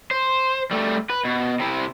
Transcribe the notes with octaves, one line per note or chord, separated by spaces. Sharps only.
C5
G3 A3
B4
B2
C3 E4